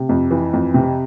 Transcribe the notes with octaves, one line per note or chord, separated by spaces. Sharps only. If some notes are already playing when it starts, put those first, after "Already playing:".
Already playing: C3
F2
E3
F2
C3